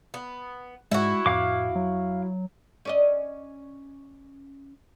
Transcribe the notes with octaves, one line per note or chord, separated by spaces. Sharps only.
B3
G#2 G#3 E4 F#4
F2 A2 F5 D6
F#3
C#4 D5 D#5